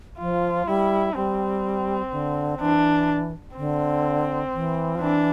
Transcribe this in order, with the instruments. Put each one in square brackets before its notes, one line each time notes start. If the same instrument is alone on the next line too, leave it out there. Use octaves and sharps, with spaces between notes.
[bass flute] F3 [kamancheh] F4
[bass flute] G3 [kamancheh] E4
[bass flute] G3 [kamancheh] C4
[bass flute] D3
[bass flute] E3 [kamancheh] D4
[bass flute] D3 [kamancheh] C4
[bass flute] E3
F3
[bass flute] E3 [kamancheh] D4